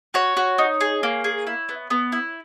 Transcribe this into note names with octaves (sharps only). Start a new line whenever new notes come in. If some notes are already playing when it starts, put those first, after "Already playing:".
F#4 C#5
F#4
D#4
G#4
A#3
G#4
E4
B3
B3
E4